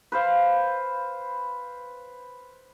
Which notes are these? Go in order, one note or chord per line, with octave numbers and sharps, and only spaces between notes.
B4 C5 F5